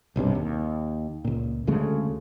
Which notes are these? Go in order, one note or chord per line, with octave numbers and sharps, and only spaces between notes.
F#1 B1 G2 C3
D#2
C#2 A#2
D2 C#3 G#3 A3